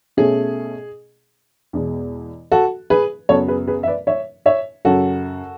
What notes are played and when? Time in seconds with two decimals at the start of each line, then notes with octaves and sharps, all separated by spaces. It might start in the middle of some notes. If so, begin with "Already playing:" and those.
0.17 B2 A3 C#4 G#4
1.73 E2 B2 G#3
2.52 F#4 A4
2.90 G#4 B4
3.29 F#2 C#3 F#3 B3 A4 C#5
3.48 G#4 B4
3.67 G#4 B4
3.83 E5
3.87 B4 D5
4.07 C#5 E5
4.46 C#5 E5
4.85 F#2 C#3 F#3 C#4 F#4 A4